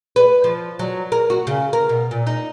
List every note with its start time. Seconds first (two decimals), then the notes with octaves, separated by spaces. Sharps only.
0.16 B4
0.44 F3
0.79 F#3
1.12 A#4
1.30 F#4
1.47 C#3
1.73 A#4
1.89 B2
2.11 A#2
2.27 D#4